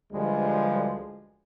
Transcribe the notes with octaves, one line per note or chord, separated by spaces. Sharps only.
D2 G2 F3 G3 G#3